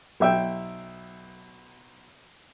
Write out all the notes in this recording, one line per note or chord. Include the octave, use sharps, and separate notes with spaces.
B1 E5 G5